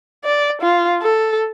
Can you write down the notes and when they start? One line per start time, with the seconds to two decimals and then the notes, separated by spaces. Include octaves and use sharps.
0.25 D5
0.62 F4
1.02 A4